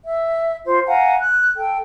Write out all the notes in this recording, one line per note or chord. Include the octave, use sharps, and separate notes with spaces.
E5
F4 C5
F5 F#5 G#5 A#5
F#6
A4 G5